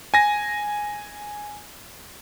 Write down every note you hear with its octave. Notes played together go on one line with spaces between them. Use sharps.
G#5 A#6